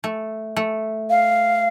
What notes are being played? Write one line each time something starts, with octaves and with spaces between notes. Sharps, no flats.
A3
A3
F5